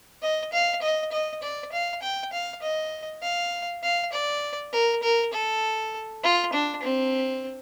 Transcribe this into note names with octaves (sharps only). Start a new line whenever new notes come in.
D#5
F5
D#5
D#5
D5
F5
G5
F5
D#5
F5
F5
D5
A#4
A#4
A4
F4
D4
C4